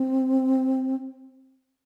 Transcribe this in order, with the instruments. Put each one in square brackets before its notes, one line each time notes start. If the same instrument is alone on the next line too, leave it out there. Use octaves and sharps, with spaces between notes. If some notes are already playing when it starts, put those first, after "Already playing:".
Already playing: [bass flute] C4